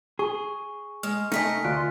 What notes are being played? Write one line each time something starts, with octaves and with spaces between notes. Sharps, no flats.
G#4 C#6
G#3 F6
C3 A3 D#4 A#4 D#5 G#5 B6 C#7
D2 F4 F#6 D7